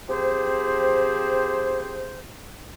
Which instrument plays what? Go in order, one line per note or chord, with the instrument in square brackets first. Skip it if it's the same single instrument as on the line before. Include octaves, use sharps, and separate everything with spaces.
[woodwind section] F3 C4 G4 G#4 C5